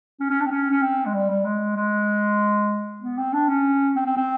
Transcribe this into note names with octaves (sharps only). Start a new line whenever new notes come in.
C#4
C#4
D4
C4
C#4
C#4
C4
G#3
G3
G3
G#3
G#3
B3
C4
D4
C#4
C4
C4
C4